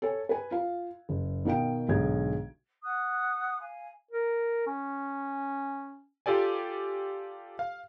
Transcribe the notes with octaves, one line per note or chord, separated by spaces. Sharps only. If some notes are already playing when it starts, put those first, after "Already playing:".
A4 C#5 G#5
B4 G#5
F4 F5
F#1
B2 D#3 F5 G5 D7
B1 G#2 D3 G#4 G#6
F#5 D#6 F#6
F5 G#5
A#4
C#4
F4 G4 A4 D5 G#5
F5